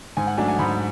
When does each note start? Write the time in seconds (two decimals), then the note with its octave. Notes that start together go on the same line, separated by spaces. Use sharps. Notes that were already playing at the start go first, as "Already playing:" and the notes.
0.17 G#2 G#5
0.27 F#5
0.37 F#3 A3 D4 G#5
0.48 G#5
0.59 G#2 B5